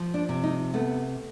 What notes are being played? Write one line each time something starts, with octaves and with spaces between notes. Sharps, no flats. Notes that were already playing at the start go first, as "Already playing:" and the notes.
Already playing: F3
D4
C3
D#4
A3 B3